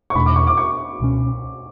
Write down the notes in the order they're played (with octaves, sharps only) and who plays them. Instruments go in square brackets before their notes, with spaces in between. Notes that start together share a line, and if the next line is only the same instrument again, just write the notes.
[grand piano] C#6
[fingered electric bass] E2 B2 A3 D4 [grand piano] B5
[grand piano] D6
C#6
D6
C#6
[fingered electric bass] C#2 B2 A3 C#4